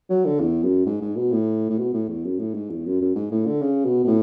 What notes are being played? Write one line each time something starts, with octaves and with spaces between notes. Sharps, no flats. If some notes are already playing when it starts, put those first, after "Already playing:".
F#3
D3
E2
F#2
G#2
G#2
B2
A2
A2
B2
A2
E2
F#2
A2
G#2
E2
F#2
F#2
G#2
A2
D3
C#3
B2
B2
A2